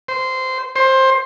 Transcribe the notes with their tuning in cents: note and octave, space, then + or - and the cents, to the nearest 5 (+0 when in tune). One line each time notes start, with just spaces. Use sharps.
C5 -15
C5 +15